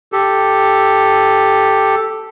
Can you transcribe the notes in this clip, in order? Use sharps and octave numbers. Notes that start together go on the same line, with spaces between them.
G4 A4